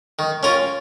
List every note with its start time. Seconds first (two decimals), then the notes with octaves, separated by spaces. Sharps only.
0.19 D#3
0.43 C#4 F4 A#4